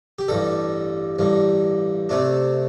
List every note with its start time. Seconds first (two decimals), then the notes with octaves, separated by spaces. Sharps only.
0.19 G4
0.28 A1 G2 G3 A4
1.19 A1 G2 G3
2.09 C3 A3 D4